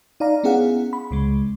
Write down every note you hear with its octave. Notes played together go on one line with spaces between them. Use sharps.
D#4 D5 F5 A#5
B3 C#4 E4 G#4 F5 F#5
B5
C#2 C#3 G#3